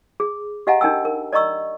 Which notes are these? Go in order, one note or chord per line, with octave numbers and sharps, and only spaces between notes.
G#4
G4 D#5 F5 F#5 G#5 A#5
D4 D#4 A#4 G5 G#5 E6
A#4
D5 D#5 A#5 C#6 E6